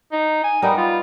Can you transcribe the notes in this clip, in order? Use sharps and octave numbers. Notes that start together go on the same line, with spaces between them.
D#4
G#5
G3 B3 D#4 A#4
F4